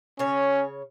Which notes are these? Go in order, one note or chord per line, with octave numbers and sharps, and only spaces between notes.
C#3 C#4 C#5